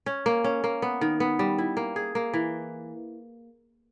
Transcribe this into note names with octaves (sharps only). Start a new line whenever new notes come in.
C#4
A#3
C#4
A#3
B3
D#3
B3
G3
E4
A#3
G#4
A#3
E3